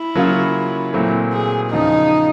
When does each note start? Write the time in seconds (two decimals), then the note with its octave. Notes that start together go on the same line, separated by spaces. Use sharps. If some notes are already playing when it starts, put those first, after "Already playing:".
Already playing: E4
0.15 C#3 F#3 A#3 C#4 F4
0.93 A#2 F#3 A3 C4 E4
1.33 G#4
1.72 E2 C#3 F3 D#4